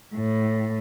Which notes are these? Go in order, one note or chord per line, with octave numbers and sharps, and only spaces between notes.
A2